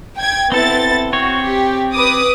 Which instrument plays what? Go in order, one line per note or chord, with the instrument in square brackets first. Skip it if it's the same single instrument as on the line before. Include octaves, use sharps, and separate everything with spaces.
[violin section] G5 G#6
[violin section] B3 E4 A6 [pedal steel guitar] C4 A4
[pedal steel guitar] C4 C#5 [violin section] F#4
[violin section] G4
B4 D6 D#6